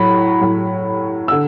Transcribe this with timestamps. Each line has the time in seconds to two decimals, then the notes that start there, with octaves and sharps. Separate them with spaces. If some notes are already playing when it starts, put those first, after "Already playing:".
Already playing: A2 F#3 B5
0.41 A2 F#3
1.28 D3 E6